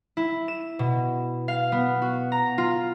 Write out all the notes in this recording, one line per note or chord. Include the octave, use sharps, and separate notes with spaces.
E4
E7
B2
F5
B3
F#4
A#5
F4